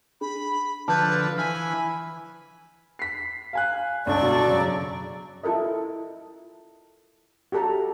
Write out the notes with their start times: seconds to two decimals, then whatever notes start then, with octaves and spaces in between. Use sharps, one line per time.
0.21 D4 G#4 B5
0.88 D3 F3 B4 A5 G6
1.38 E3 G#5 B5 F6
2.99 B6 C7
3.53 F5 G#5 F#6
4.06 G1 C#2 A4 D5 C#6
4.23 B2
4.47 F#2 C#3
5.43 E4 F4 A4 A#4 D#5
7.52 F#4 G4 A4 A5 A#5